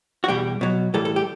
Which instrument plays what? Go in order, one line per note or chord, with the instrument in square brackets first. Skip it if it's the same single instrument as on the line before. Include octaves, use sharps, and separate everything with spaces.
[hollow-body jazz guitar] F#4
E2 B2 G3 G4
B2 F#3
A2 E3 G3 A4
A4
G4